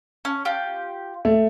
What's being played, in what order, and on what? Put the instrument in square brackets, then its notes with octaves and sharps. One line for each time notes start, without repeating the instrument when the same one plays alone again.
[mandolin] C#4
F4 G4
[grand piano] A3